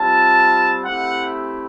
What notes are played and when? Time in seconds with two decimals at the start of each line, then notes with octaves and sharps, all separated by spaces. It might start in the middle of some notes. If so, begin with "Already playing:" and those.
Already playing: G3 C4 F4 A5
0.84 A3 C4 E4 G4 F#5